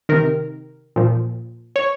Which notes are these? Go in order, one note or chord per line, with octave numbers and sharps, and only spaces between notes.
C3 D#3 A#4
A#2 F3
C#5